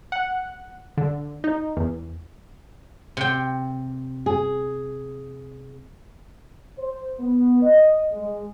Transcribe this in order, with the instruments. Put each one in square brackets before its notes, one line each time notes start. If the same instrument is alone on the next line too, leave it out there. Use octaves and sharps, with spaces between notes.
[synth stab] F#5
D3
D#4
E2
[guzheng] C3 G5
[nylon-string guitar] G#4
[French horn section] C5
B3
D#5
G#3